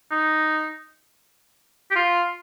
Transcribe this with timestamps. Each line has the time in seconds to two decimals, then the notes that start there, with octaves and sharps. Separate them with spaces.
0.11 D#4
1.91 G4
1.96 F4